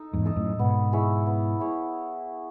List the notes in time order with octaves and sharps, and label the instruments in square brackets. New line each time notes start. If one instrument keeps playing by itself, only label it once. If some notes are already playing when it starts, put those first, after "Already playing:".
Already playing: [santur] D#4 A4 D#5
[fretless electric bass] E2 G#2
[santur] A4 D#5
[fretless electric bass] F#2 A2
[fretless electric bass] G#2 B2 [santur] B3
[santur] E4 G#4 C#5
B3
E4 G#4 C#5